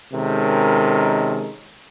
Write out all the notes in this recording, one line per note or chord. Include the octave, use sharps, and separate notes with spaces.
C3 D#3 G#3 C#4 A4 A#4